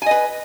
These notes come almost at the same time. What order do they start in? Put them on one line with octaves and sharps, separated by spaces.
G#5 D#5 B4